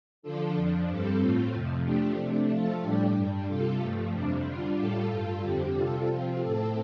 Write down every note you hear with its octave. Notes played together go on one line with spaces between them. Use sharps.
D3 F3 D4 F4 A4
F2 F3 D4
G2 G3 C4 A4
A2 A3 C4 F4
F2 C3 F3
F3 A3 D4 G4
C3 A3 D4
F3 A3 F4 A4
A2 G3 D4 G4
G2 G3 D4
C3 G3 F4 A4
G2 F3 A3
F2 C3 G3 D4
D3 G3 D4 F4
A2 G3 F4 A4
G2 G3 F4 A4
F2 D3 G3 C4 G4
C3 G3 F4 A4
C3 F3 C4 F4
A2 A3 C4 A4